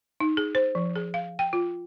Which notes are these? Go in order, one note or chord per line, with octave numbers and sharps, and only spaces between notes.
D#4
G#4
C5
F3
G#4
F5
G5
F4